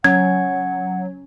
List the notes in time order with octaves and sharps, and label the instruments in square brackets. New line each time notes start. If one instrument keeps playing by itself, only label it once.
[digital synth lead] F#3 [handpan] C#4 [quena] F#5 [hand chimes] G#6